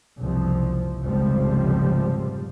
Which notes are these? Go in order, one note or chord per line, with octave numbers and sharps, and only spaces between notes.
F#1 C2 F3
F1 C#2 G#2 C3 F3 G3